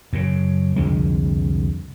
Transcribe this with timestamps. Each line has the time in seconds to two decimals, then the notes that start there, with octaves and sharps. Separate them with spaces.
0.13 F#2 C#3
0.76 C2 F2 D3 G#3